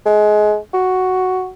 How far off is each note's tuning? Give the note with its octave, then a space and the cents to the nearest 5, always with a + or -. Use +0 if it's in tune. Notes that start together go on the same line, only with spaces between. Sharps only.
G#3 +25
F#4 +5